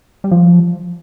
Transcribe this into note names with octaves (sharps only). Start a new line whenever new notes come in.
G3
F3